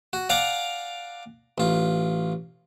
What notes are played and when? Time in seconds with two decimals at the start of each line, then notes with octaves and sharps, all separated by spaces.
0.13 F#4
0.29 D5 F5 F#5 G#5 A#5 D6
1.58 A1 F4